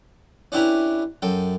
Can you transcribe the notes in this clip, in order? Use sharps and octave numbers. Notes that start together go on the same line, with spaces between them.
C#4 D4 E4 G4 B4 A#5
F#2 A4 G5